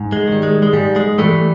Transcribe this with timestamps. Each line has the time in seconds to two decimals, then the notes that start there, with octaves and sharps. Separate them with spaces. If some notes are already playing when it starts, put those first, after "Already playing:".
Already playing: G#2
0.12 G#3
0.28 D#3 G3
0.43 G#3
0.63 G#3
0.73 G#2 G3
0.96 G#3
1.19 E3 G3 A3